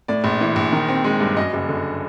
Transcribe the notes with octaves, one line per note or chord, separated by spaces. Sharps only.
A2 D5
A#1
E3
A#1
D#3
C4
G#3
G2
F#2 D#5
F#1
D3